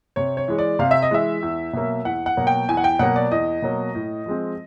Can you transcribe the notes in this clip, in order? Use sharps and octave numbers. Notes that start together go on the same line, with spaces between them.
C3 C#5
C#5
E3 G#3
D5
C3 F5
E5
D#5
E3 G#3 E5
E2
B2 F#3 A#3
E2 F#5
F#5
B2 F#3 A#3
G5
E2 G#5
F#5
G5
B2 F#3 A#3 F#5
D5
E2 D#5
B2 F#3 A#3
A2
F3 G#3 C4